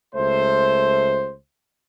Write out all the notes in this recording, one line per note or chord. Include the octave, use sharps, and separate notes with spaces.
C#2 A3 C5